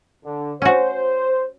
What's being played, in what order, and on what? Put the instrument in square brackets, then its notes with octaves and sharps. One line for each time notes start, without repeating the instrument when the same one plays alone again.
[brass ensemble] D3
[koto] C#4 F#4 [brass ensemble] C5